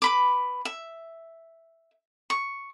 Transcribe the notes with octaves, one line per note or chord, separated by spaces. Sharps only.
B4 B5 D6
E5
C#6